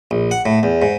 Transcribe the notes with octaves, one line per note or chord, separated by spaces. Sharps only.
A#1
F#5
A2
E2
G#2